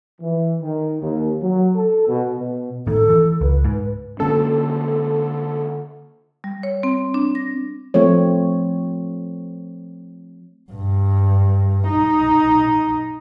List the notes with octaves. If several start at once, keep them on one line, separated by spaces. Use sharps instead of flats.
E3
D#3
D#2
F#3
A4
B2
B2
A2 D#3 A4
E3
C#2 B4
G#2
D3 A#3 C#4 A4
G3
C#5
C4
D4
A#6
F3 A3 C4 C#5
G2
D#4